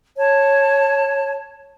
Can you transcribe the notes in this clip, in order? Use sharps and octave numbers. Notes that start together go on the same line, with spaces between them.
C#5 A5